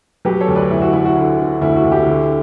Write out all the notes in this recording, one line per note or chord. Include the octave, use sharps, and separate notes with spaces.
F#3 G4 B4
A4 C#5
D2
B4 D5
D2 E4
F#4
D2 E4
F#4
D3
D3
D2 E4
F#4
D2
E4 G4
D3